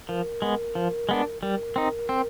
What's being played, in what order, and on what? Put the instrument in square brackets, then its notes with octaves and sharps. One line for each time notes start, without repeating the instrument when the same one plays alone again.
[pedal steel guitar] F3 [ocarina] A#4
[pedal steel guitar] G#3 B3
F3
G#3 B3 D4
[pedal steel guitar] G3 [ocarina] A#4
[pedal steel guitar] C4 D#4
C4